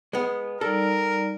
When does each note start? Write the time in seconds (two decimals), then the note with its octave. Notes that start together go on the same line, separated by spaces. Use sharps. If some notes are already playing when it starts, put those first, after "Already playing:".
0.13 G#3 B3
0.61 G3 D#4 A4 A#4 D5